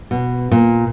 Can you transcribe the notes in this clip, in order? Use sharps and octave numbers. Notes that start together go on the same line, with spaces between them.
B2
A#2